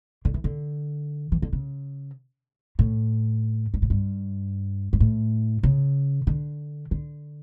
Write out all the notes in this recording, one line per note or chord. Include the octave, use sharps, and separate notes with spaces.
D3
E3
D3
E3
D3
C#3
A2
G2
A2
G2
G2
A2
C#3
D3
D3